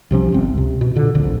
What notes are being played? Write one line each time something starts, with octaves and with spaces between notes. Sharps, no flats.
C2 C3 F3 C#4
G1 C4
C#2 C3
B2
A#2 D3
D1 A#1 D3